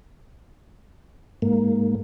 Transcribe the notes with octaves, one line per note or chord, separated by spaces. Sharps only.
G#2 A#3